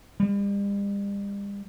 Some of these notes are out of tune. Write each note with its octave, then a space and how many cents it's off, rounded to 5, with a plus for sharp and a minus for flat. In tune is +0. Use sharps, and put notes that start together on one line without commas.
G3 +40